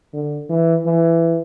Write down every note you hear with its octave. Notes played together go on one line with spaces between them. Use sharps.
D3
E3
E3